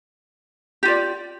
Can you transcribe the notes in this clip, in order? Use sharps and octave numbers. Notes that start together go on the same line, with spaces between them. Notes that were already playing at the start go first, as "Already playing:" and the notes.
F4 G4 D5